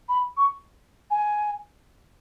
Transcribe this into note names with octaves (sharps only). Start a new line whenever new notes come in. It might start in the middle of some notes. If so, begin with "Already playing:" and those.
B5
C#6
G#5